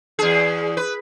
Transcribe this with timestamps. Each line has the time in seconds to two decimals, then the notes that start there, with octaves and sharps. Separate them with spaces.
0.19 E2 G#4
0.77 B4